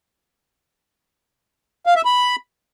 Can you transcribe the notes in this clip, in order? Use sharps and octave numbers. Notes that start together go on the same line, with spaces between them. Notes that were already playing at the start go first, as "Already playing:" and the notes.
F5
E5
B5